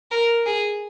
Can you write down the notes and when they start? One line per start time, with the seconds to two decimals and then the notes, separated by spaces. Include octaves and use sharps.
0.11 A#4
0.46 G#4